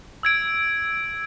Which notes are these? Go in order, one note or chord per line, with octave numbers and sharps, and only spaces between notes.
E6 G#6 D7